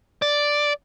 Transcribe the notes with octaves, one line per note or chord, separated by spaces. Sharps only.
D5